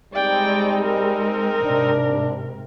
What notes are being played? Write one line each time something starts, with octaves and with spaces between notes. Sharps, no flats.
G3 G#3 C4 D#4 D5 G5
A#4
G#2 C3 D4